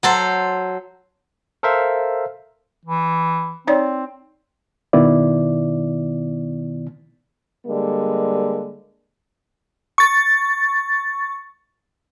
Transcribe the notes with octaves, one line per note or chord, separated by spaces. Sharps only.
F#3 A4 C5
A4 A#4 C5 E5 F5
E3
C4 D#4 C#5 D5
B2 D#3 B3 E4 D5
D3 G3 G#3 A#3
C#6 A6